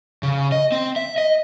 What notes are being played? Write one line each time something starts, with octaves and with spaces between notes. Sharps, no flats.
C#3
D#5
C4
E5
D#5